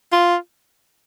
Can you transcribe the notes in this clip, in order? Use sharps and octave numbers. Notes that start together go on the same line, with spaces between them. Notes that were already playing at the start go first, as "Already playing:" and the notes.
F4